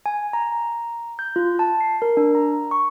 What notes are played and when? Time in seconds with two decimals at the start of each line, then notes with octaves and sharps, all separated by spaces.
0.06 G#5
0.33 A#5
1.19 G6
1.36 F4
1.59 A5
1.81 C7
2.02 A#4
2.17 D4
2.35 A#5
2.71 C#6